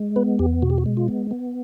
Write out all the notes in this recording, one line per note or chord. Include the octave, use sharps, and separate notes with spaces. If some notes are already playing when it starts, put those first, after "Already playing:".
Already playing: G#3
B3 B4
E2 G4
B2 F#4
G4
F#4
G#3
F4
B3
B3